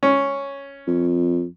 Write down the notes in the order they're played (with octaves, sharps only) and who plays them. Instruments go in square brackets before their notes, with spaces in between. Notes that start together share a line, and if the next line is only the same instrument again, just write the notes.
[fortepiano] C#4
[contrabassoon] F2